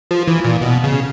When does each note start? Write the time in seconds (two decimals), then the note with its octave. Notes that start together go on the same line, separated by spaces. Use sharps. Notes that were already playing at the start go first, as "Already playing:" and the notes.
0.11 F3
0.28 E3
0.45 A#2
0.61 B2
0.84 C#3